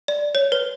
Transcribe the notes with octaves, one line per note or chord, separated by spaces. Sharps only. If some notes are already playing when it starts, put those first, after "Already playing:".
D5
C#5
B4